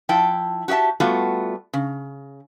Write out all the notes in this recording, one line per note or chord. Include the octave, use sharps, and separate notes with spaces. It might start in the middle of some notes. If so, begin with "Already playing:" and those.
F3 E4 G5 A5
F#4 G4 D#5 E5 A5
G3 A3 B3 F4 F#4
C#3